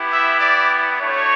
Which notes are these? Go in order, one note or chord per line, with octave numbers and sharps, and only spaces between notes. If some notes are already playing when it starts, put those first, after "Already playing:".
Already playing: B3 E4 G4
E5
D5
A3 D4 F#4 C#5